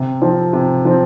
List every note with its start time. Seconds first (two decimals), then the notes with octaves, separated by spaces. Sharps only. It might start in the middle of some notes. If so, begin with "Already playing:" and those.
Already playing: C3
0.22 F3 C4
0.53 C3
0.85 F3 C4